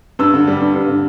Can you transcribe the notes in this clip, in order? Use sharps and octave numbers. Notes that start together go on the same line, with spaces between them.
G2 E6
D3
G3
G2
G2
D3